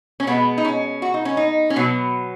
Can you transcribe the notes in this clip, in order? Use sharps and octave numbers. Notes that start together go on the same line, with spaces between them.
C#4
B2 G#3 B3
D#4
C#4
F#4
D#4
C#4
D#4
C#4
B2 F#3 B3